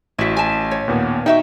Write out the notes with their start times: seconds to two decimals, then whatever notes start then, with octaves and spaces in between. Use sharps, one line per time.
0.19 A1 E4 F#4 B6
0.37 G#5 A5
0.71 C#5
0.88 D#2 A#2 B3
1.26 D#4 F#4 E5 G5